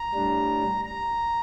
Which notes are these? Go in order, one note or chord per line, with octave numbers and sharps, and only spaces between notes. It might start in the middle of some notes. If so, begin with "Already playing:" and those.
Already playing: A#5
A2 G3 D4
A#5